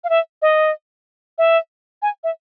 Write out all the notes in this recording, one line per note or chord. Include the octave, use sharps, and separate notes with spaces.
F5
E5
D#5
E5
G#5
E5